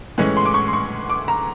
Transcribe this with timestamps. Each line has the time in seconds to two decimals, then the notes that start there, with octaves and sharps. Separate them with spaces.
0.18 A2 E3 G#3 C#4
0.37 C6
0.45 D6
0.54 C#6
0.68 C6
0.73 C#6
1.10 D6
1.28 A#5